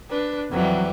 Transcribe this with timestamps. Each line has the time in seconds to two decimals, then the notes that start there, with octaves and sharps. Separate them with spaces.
0.10 D4 B4
0.51 F2 E3 F#3 G3